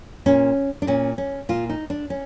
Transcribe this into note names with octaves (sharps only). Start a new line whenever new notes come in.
A#2 C#4
D4
A#2 C#4
C#4
A#2 F4
D#4
D4
C#4